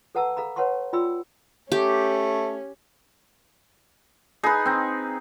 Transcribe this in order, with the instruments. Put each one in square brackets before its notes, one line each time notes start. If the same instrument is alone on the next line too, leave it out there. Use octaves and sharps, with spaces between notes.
[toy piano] A4 B4 F#5 A5 A#5 E6
A4 F5 A#5 B5
B4 C#5 F#5 A5 C6 C#6
F4 D5 G5 B5 C6 E6
[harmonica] A3 [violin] C#4 [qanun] G4
[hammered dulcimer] D#4 [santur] G#4 B4
[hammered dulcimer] C4 D#4